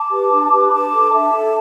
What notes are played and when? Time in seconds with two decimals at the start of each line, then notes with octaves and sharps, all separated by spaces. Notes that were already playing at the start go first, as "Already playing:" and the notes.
Already playing: A5 D6
0.12 G4 B4
0.32 D4
0.52 G4 B4
0.67 B5
0.72 D4 A5 D6
0.92 A4
1.12 D4 E5 A5
1.33 A4